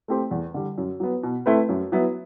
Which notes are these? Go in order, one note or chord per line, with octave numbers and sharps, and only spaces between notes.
A3 C4 G4 C5
E2
D3 G3
F#2
F#3 B3
B2
A3 C4 E4 B4
F#2
F#3 B3 E4